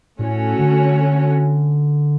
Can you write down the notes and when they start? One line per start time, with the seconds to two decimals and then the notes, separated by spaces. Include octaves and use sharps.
0.19 A2 A3 C#4 F#4 C#5
0.59 D3